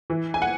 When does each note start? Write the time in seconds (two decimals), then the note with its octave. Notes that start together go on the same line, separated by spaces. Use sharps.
0.10 E3
0.34 G#5
0.42 F#5